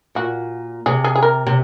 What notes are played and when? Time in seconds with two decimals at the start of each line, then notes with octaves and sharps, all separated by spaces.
0.15 A#2 F#4
0.86 C3 G#4
1.04 G#4
1.15 G#4
1.22 A#4
1.47 C3